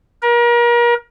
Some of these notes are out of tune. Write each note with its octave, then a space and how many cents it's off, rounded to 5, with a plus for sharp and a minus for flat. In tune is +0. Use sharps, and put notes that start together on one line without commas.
A#4 +35